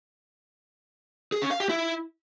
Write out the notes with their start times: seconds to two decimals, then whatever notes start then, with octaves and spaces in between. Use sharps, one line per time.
1.32 G#4
1.42 C#4
1.51 F5
1.60 G4
1.69 E4